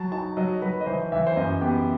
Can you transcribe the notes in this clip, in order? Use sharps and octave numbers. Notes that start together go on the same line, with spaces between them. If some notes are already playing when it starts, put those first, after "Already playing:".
Already playing: F#3 A5
D#4 A5
F#3 D#5
F#3 B4
D#5
E3 C5
E3 E5
C5
F#2 D#5
B3 G4